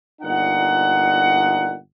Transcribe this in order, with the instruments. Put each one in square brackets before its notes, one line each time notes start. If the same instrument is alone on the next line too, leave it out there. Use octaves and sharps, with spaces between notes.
[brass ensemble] G1 A#2 D#4 F#5